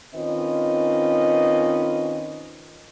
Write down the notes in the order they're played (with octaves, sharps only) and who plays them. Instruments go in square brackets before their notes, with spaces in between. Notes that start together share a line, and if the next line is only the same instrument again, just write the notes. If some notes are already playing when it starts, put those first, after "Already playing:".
[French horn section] D#3 C4 C#4 F4 B4 D#5